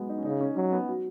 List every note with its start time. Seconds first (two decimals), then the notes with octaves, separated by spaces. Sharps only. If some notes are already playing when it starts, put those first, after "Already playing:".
Already playing: F#3 G#3 B3
0.09 D#4
0.18 C#4
0.25 C#3 D#4
0.41 C#4
0.56 F#3 C#4
0.72 B3
0.88 F#3